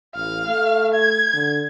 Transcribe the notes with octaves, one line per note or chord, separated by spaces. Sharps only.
A1 F5
A3
G#6
D3